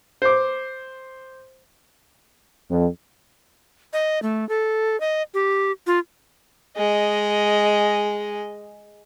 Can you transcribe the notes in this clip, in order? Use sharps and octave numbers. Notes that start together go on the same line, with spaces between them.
C5 D6
F2
D#5
A3
A4
D#5
G4
F4
G#3 D#5